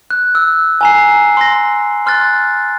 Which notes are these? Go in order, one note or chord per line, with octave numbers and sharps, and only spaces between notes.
F#6
E6
G#5 A#5 C7
C6 A#6
C6 F6 F#6 A6